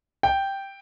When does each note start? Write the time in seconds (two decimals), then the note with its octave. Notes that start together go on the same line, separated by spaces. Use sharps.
0.23 G5